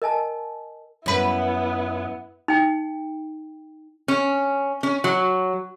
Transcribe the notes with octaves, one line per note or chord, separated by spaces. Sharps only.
A#4 D#5 G#5 A5
F#2 B3 E4 B4
D#4 G5
C#4
C#4
F#3